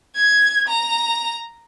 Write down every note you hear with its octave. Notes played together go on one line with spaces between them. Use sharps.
G#6
A#5